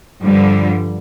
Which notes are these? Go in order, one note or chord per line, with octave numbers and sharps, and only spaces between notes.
G2 D3 F3 G3